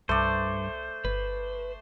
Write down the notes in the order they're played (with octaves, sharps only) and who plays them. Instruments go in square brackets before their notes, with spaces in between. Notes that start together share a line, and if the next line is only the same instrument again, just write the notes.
[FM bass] C2 [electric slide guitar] G2 [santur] A3 D5 [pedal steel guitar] C5
[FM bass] G1 [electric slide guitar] B4